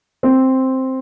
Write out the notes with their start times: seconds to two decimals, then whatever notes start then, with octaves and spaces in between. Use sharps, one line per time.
0.23 C4